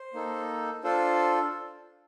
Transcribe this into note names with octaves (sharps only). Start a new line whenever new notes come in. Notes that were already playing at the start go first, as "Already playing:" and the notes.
Already playing: C5
A#3 D#4 A4
D4 F4 A4 C5